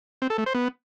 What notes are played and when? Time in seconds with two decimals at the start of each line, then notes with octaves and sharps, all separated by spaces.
0.22 C4
0.30 A4
0.38 A3
0.46 C5
0.54 B3